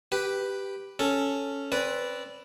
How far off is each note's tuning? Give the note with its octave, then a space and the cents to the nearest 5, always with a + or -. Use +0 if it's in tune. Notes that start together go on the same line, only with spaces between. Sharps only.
G4 +0 B4 +0
C#4 +0 A4 +0
C4 +20 B4 +0 D5 -15